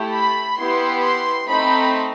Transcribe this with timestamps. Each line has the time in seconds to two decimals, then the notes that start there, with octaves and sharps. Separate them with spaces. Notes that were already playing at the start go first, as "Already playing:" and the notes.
Already playing: A3 E4 G4
0.13 B5
0.58 B3 E4 G4 C6
1.02 C6
1.47 A3 C4 D#4 B5